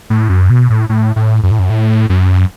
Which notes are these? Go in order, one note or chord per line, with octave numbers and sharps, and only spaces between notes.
A2
F#2
B2
A2
A2
A2
F#2
A2
F#2
A2
F#2